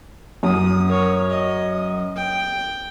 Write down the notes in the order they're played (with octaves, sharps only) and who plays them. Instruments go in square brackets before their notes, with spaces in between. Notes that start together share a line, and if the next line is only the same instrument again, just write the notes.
[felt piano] F#2 [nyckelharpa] D#6
[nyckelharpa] A#4 C#5
D#5
G5